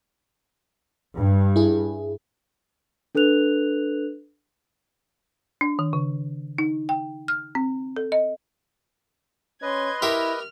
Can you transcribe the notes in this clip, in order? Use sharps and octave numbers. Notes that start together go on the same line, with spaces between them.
G2
E4 G#4
D4 A4 B4 F#6 F7
D4
D#3
C#3
D#4
G5
F6
C4
A4
D#5
C#4 B4 D#5 C6 G#6
E4 G4 A#4 E5 F6